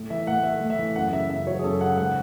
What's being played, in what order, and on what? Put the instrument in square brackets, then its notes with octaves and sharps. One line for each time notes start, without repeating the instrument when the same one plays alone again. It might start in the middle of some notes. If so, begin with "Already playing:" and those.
Already playing: [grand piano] A2
E3 E5
A2 F#5
A3 E5
A2
E5
E3
F#2 F#5
C#3 E5
F#2 E5
F#3 C#5
G#4
F#2 A4
C#3 F#5
G#2 F#5